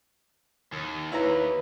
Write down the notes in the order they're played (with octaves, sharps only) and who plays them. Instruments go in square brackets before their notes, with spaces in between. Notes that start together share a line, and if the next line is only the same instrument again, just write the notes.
[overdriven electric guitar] D#2
[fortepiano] E4 C#5 A#5 [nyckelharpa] B4